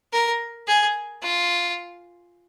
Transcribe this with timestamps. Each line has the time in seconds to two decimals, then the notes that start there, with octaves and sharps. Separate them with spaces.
0.13 A#4
0.68 G#4
1.23 F4